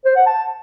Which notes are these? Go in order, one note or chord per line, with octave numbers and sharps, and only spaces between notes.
C5
F#5
A5